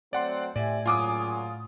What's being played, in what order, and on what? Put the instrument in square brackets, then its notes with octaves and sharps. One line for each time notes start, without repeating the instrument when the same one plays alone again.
[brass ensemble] F#3 A3 C4 [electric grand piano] D5 F#5 C6
[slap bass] A2 [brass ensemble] G4 E5 G#5 [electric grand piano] D5
[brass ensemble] A#2 C#3 F#3 [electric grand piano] F4 [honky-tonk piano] G#5 D6 D#6